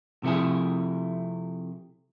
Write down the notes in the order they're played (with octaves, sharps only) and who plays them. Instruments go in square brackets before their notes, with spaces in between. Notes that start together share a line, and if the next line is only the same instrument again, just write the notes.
[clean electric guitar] C3 F3 A3 E4 G#4